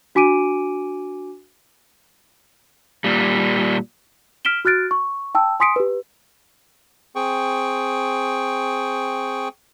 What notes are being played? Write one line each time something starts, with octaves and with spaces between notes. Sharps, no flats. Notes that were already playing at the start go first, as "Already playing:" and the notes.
D4 F#4 G#5 D6 D7 D#7
A#2 G3
F6 B6 D7 E7 G7
F#4 F6 F#6 A6 D7
C#6
G5 A5 E6
G#5 C6 D#6 B6 C#7 D7
G4 B4
C4 G#4 G5 C#6